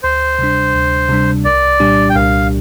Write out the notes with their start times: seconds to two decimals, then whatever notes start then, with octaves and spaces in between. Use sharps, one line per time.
0.03 D2 C5
0.39 C3 G3 D4
0.74 D2
1.09 C3 G3 D4
1.45 C2 D5
1.80 A#2 G3 D4 G4
2.10 G5
2.15 C2 F5